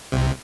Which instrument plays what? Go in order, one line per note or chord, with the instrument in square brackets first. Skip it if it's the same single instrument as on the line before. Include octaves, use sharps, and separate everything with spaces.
[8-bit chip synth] C2 C3